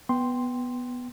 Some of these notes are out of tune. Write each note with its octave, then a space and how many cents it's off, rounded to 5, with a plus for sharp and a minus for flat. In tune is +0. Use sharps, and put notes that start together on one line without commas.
B3 +0 G5 +0 C6 +0